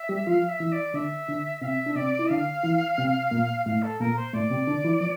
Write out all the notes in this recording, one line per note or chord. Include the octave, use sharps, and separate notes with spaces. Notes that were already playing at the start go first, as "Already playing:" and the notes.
Already playing: E5
G3 G4
F3 F4 F5
E5
E3 E4
D5
D3 D4 E5
D3 D4
C3 C4 E5 F5
D4
C3 C4 D5
E4
D3 D4 F5
E3 E4
C3 C4
A#2 A#3
A2 A3 F5
A4
A#2 A#3 A#4
C5
A2 A3 D5
C3 C4
D3 D4
E3 E4
F3